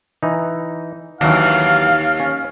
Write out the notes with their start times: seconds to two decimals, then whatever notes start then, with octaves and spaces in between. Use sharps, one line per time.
0.23 E3 D#4
1.21 D#2 E3 F#3 D4 F5
2.20 C#4